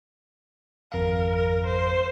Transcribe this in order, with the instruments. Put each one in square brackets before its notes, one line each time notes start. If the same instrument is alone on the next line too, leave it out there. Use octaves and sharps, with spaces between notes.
[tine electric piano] G#1 F2 F5 [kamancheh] A#4
[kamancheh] A#4
C5